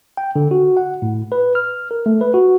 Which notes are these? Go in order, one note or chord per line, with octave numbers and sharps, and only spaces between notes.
G5
D3
F#4
F#5
A2
B4
F6
A#4
A3
B4
F#4